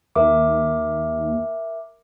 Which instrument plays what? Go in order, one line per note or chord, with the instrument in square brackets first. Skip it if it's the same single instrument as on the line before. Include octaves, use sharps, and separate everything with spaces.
[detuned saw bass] D#2 [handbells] A#4 E5 D6